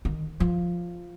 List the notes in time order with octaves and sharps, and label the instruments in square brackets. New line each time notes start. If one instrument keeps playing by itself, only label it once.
[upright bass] D#3
F3